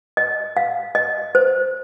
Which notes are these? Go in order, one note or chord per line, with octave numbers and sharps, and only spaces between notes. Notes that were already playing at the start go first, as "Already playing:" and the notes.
D#5
F5
D#5
C5